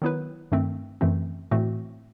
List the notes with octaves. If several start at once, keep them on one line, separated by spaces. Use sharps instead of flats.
D#3 F#3 B3 E4 B4
G2 D#3 A3 C4
F#2 E3 A3 C4
A2 E3 A3 C4 F#4